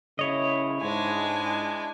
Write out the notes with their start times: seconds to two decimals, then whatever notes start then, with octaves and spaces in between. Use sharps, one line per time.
0.19 C#3 E4 C#5 D#5
0.82 G#2 G#3 D4 G#5